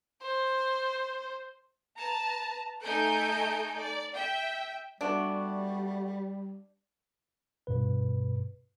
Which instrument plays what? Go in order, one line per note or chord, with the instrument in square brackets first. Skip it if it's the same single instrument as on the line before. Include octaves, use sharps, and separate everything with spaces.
[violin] C5
[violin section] B4 A5 A#5
A3 D#4 A4 G#5 G6 D7
D5
E5 G5
[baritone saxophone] G3 [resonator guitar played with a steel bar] A3 B3 F#4 [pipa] D4
[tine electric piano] G2 B2 B4